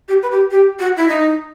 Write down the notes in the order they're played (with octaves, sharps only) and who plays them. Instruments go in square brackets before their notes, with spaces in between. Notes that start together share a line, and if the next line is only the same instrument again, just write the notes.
[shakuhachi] G4
B4
G4
G4
F#4
E4
D#4